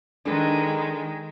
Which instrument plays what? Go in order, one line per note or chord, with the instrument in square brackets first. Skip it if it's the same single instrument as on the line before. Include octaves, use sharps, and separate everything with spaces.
[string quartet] D#3 G#3 [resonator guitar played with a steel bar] D4 A4 B4